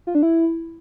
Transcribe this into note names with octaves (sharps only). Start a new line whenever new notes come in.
F4
D4
E4